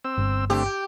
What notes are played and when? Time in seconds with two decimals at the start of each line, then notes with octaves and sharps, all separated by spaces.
0.05 C4 E6
0.18 G1
0.50 D3 A3 C4 G4
0.66 G5